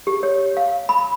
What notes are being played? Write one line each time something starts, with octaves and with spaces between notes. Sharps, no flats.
G4
C#5
F5
B5